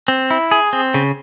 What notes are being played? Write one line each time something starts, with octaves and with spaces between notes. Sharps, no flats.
C4
E4
G#4
C4
C#3